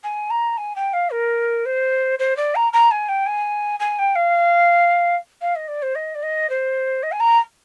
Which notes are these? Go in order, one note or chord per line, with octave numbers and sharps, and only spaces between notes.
G#5
A#5
G#5
G5
F5
A#4
C5
C5
D5
A#5
A#5
G#5
G5
G#5
G#5
G5
F5
F5
D#5
D5
C5
D#5
D5
D#5
C5
D#5
G#5
A#5